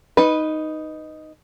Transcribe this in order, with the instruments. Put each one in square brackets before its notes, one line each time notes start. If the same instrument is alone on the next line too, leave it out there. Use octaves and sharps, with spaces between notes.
[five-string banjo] D#4 B4